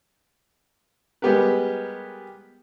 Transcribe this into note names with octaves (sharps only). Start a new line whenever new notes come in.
G3 G#3 B3 G4 A#4 B4